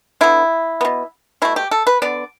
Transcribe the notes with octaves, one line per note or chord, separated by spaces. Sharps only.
D3 B3 E4
B2 B3
B2 A3 E4
G4
A4
B4
D3 B3 D5